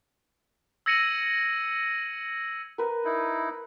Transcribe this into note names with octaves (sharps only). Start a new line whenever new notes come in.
E6 G#6 A#6 C#7 D#7 F#7
A#4 B4
D#4 E4